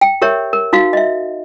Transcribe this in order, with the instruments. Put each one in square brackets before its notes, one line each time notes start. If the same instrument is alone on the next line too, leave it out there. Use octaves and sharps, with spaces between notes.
[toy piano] G5
G4 A#4 C#5 E5
A#4
D#4 F#4 F5
D#5 E5